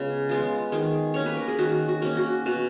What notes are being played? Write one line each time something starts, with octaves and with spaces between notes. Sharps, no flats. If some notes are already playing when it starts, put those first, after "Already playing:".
Already playing: C#3 G#3 B3 F4
G#3 B3 F4
D#3 G#4
A#3 C#4 C#5
B4
A#4
G#4
D#3 F#4
F#4
A#3 C#4
F#4
B2 F#4